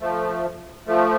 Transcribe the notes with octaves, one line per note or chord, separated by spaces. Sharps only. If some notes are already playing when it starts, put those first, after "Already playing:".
F3 A3
F3 A3